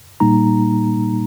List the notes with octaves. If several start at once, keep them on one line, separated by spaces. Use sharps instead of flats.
A#2 G3 A#3 D#4 A#5